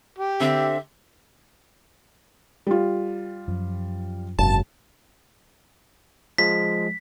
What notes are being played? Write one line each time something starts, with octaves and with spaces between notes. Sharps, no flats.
G4
D3 C4 E5
G3 F4
F#2 F3
F#1 G#2 C3 A5
F3 G#3 B6